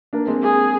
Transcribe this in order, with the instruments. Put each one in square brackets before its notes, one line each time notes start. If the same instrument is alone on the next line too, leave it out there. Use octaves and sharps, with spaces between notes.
[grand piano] A#3 D4
G#3 C4
[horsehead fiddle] G#4